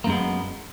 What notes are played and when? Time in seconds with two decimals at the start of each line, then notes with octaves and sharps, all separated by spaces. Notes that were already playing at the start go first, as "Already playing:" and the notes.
0.04 A#3
0.07 F#2
0.10 G#3
0.12 B3